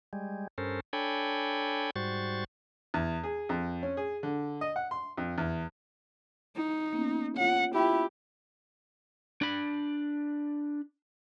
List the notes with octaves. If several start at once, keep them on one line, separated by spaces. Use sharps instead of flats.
G3 G#3
G2 C#4 A4 A#4 C5
D4 A4 C#5 G5 G#5 B5
G#2 G3 F#4 C5 C#6 A6
E2
G#4
F2
C#4
G#4
D3
D#5
F#5
C6
F2
E2
D#4
A#3 B3 C#4
F4 C#5 F#5
E4 F4 G4 G5
D4 B5